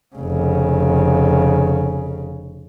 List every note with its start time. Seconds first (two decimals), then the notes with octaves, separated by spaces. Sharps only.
0.16 F1 C#3